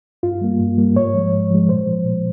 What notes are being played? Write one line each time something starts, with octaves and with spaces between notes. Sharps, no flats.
G2 F4
G3 A#3
G2
G3 A#3
G#2 C#5
F3 G#3
G#2
F3 G#3
A#2 C5
F3 G#3
A#2